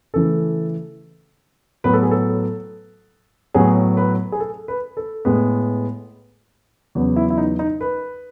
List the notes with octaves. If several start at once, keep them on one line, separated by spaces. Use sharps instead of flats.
C#3 E3 A3 A4
A2 F#3 B3 B4
A4
G#4
A4
A2 F#3 B3 G#4
B4
G#4
A4
B4
A4
A2 G#3 B3
E2 C#3 F#3 B3
E4
E4
D#4
D#4
B4